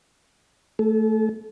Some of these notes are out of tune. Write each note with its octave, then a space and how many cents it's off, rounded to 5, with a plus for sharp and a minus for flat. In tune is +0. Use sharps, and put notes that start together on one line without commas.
A3 +5 A4 -40